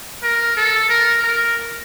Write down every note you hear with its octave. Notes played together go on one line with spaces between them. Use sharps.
A#4
A4
A#4
A#4